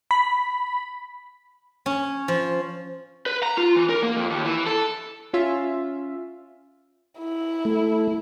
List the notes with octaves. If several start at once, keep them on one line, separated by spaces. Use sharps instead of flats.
B5
C#4
F3
B4
A#5
F4
E3
A#4
A#3
F2
D#2
E3
A4
C#4 F4 E5
E4
A3